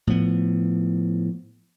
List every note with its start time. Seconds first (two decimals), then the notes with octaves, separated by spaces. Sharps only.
0.07 A2 F3 B3